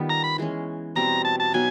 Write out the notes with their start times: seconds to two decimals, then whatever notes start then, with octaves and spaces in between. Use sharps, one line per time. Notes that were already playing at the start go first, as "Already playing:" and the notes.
Already playing: D#3 G3 B3 F4
0.09 A#5
0.24 B5
0.38 E3 G#3 C#4
0.95 B2 G3 C4 A#5
1.25 A5
1.40 A5
1.53 B2 F#3 B3 D#4 G#5